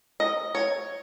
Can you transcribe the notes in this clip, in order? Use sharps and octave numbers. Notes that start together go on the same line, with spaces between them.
D#5
C#5